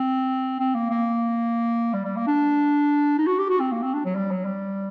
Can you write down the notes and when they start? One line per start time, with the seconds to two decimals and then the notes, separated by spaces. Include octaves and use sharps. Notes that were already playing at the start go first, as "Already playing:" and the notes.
Already playing: C4
0.60 C4
0.75 A#3
0.90 A#3
1.93 G3
2.04 G3
2.16 A#3
2.27 D4
3.18 D#4
3.27 F#4
3.39 G4
3.49 F#4
3.60 C4
3.72 A#3
3.82 C4
3.94 D4
4.05 F#3
4.15 G3
4.31 F#3
4.45 G3